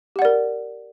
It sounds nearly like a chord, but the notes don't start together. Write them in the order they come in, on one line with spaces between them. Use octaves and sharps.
G4 F#5 D5 A#4